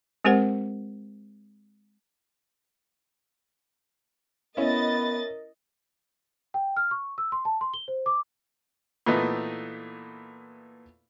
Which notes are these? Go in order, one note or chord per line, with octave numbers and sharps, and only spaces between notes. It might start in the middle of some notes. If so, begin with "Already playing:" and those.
G#3 C4 G4 A#4 C5 F#5
B3 C#4 E4 A#4 D#5 A6
G5
F6
C#6
E6
C6
A5
C6
G7
C5
D6
A#2 E3 A3 B3 D#4